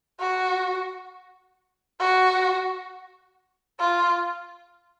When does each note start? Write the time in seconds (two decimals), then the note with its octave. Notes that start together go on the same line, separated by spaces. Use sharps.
0.20 F#4
2.00 F#4
3.80 F4